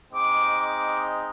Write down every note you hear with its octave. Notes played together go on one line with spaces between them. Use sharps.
G#3 C4 D#4 D6
D6